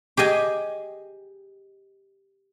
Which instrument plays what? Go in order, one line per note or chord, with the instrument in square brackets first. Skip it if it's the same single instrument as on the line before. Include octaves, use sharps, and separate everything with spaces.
[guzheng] G4 G#4 D#5 G#5